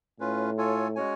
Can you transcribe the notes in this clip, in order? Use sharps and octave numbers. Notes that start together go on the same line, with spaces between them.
A2 C#4 F4 B4
F4 A4 C#5 G#5
G#3 C#4 F#4 C#5 G#5